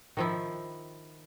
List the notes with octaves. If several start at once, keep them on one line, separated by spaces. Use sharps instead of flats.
D#3 F3 E4